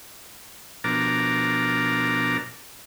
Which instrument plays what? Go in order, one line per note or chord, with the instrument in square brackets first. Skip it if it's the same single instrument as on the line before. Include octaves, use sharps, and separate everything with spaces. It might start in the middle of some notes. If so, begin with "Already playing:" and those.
[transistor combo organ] B2 F3 D4 A#4 A#5 D6